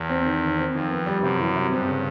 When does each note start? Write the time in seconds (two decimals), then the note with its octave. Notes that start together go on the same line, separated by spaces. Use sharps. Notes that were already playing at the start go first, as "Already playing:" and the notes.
Already playing: E2
0.09 C4
0.25 D#3
0.42 D#3
0.58 C4
0.74 F2 D#3
0.90 B3
1.06 G3
1.23 F#2 C3
1.39 E3
1.55 C3
1.71 G2 C4
1.87 C#3